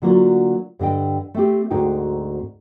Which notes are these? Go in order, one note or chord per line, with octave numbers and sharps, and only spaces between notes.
D3 F#3 A#3 D#4 F4 F#4
G2 D3 D#5 G5
A3 C4 G4
D2 G#2 C4 D#4 F#4 G5